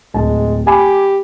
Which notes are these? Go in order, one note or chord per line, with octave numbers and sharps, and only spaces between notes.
D1 G#3 A5
G4 G#5 B5 D6